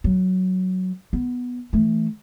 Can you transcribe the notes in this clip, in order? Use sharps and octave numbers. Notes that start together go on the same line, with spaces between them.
F#3
B3
E3 A3